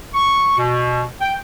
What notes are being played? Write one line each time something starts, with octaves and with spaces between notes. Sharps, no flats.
C#6
B2
G5